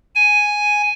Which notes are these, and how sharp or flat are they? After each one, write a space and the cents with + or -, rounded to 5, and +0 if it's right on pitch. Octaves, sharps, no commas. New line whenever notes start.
G#5 +0